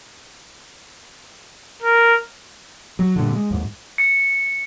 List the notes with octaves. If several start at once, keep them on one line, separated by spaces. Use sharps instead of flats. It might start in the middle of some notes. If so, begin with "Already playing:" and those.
A#4
F#3
G2 A#2 D3
G#3
D#2 G#2
C#7